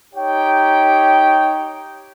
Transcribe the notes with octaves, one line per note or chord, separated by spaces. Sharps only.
D#4 G4 C#5 G5